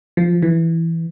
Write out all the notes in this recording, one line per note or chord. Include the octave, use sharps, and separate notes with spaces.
F3
E3